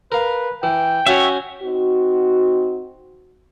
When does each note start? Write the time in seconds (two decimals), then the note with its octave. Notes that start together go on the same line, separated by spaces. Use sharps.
0.12 A#4 B4 F5
0.63 E3 G5
1.07 C#4 F#4 C#5 E5 G#5
1.63 C4 D#4 F#4